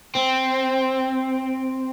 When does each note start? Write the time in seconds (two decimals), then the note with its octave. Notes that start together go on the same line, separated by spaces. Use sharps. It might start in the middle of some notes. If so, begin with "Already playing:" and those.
0.15 C4